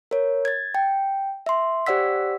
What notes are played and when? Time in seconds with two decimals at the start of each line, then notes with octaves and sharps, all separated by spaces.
0.11 A#4 C#5
0.45 G#6 A6
0.75 G5
1.46 E5 C6
1.87 G4 C5 D5 F#5 E6 B6